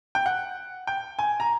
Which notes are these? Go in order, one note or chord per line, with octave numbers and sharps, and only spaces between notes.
G5
F#5
G5
G#5
A#5